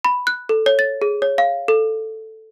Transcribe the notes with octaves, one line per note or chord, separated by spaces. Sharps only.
B5
F#6
A4
C#5
A6
G#4
C#5
F5
A4